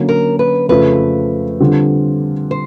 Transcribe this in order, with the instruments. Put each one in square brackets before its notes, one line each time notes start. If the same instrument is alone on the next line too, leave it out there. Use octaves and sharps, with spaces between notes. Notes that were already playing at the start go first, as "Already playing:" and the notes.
Already playing: [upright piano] D3 F#3 A#3 C#4 F#4
[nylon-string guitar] A#4
B4
[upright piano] F2 C#3 F3 A3 [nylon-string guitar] B4
[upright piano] D3 G3 C4 F4
[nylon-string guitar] C5